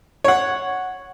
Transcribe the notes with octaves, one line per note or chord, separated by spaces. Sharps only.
C#5 F#5